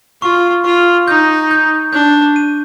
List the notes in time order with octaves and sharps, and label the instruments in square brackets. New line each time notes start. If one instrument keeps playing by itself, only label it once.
[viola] F4 [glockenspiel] C#6
[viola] F4 [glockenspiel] C#6
[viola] D#4 [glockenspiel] G6
[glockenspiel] G6
[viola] D4 [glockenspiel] G6
[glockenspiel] D#7